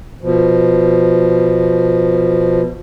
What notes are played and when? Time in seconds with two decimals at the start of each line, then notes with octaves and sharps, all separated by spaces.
0.21 B2 F3